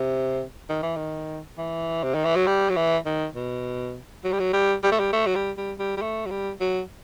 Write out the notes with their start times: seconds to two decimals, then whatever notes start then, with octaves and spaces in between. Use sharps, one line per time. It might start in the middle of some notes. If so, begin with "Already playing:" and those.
Already playing: C3
0.70 D#3
0.83 E3
0.97 D#3
1.58 E3
2.03 C3
2.14 D#3
2.25 E3
2.36 F#3
2.47 G3
2.70 F#3
2.76 E3
3.06 D#3
3.35 B2
4.24 F#3
4.32 G3
4.39 F#3
4.53 G3
4.84 G3
4.91 A3
4.99 G3
5.13 A3
5.27 F#3
5.35 G3
5.57 G3
5.79 G3
5.97 G3
6.02 A3
6.26 F#3
6.31 G3
6.61 F#3